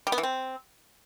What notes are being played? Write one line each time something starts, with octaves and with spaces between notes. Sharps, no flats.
G3
B3
E3
C4